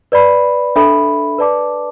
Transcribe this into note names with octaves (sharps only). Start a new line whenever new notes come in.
B4 D5 B5
D4 A4 E5 B5
B4 D5 A5 D6